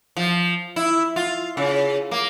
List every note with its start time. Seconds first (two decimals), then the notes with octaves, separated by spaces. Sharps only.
0.17 F3
0.76 E4
1.16 F4
1.57 C#3
2.11 A#3